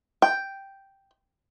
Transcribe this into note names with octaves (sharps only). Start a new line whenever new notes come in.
G5